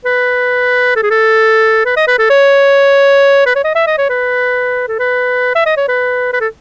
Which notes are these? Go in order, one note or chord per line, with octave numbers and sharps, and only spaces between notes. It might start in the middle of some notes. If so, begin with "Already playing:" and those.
B4
A4
G#4
A4
B4
D#5
B4
A4
C#5
B4
C#5
D#5
E5
D#5
C#5
B4
A4
B4
E5
D#5
C#5
B4
B4
A4